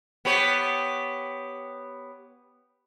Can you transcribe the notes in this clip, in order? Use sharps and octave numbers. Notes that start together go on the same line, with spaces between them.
B3 G4 C#5